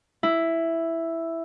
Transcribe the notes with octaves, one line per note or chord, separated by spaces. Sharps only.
E4